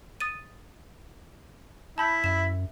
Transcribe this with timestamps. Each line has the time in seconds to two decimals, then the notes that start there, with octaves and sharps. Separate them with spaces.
0.20 D#6 A6 D#7
1.98 E4 A5 B5 G6
2.24 F#2 E5 E7